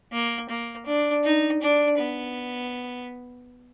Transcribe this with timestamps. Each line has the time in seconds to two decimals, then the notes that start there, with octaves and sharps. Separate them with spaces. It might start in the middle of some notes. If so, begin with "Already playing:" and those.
0.12 A#3
0.49 A#3
0.86 D4
1.24 D#4
1.62 D4
1.98 B3